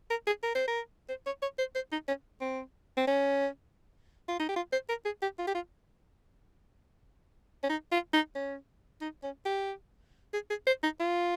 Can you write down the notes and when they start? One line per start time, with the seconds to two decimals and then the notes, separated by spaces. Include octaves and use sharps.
0.10 A#4
0.27 G#4
0.43 A#4
0.55 C5
0.67 A#4
1.09 C5
1.26 C#5
1.42 C#5
1.58 C5
1.75 C5
1.92 D#4
2.08 C#4
2.41 C4
2.97 C4
3.07 C#4
4.28 F4
4.40 D#4
4.49 G4
4.56 F4
4.72 C5
4.89 A#4
5.05 G#4
5.22 G4
5.38 F4
5.47 G4
5.55 F4
7.63 C#4
7.69 D#4
7.92 F4
8.13 D#4
8.35 C#4
9.01 D#4
9.23 C#4
9.45 G4
10.33 G#4
10.50 G#4
10.67 C5
10.83 D#4
11.00 F4